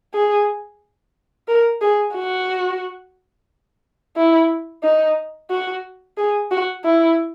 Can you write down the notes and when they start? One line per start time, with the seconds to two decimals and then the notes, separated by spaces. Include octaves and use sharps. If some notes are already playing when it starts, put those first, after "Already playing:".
0.14 G#4
1.48 A#4
1.81 G#4
2.15 F#4
4.16 E4
4.83 D#4
5.50 F#4
6.17 G#4
6.51 F#4
6.84 E4